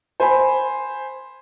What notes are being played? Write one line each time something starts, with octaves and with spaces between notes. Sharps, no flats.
C5 G#5 B5